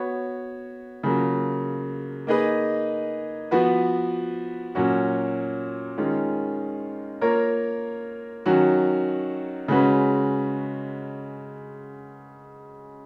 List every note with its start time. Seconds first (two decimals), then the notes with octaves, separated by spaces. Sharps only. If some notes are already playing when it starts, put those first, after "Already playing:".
Already playing: B3 F#4 C#5
1.03 C#3 F#3 A#3 F4
2.27 A#3 D#4 G#4 B4 D#5
3.51 F3 B3 F#4 B4
4.75 A#2 F#3 C#4 F#4 C#5
5.98 D#3 G#3 C#4 F4
7.21 A#3 F4 A#4 C#5
8.46 D#3 F#3 C#4 F#4
9.68 C#3 G#3 C#4 F#4 B4